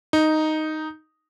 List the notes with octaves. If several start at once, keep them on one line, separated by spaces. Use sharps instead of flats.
D#4